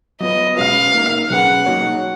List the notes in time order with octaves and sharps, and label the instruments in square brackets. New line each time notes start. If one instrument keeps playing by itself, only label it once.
[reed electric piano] F#3 B3 F4 B4 [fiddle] D#5
[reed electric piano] B2 G#3 C#4 F#4 B4 [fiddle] F5
[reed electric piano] A#3 D#4 A#4
[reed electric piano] B2 F#3 C#4 G#4 B4 [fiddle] F#5
[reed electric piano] F#3 A#3 D#4 F#4 C#5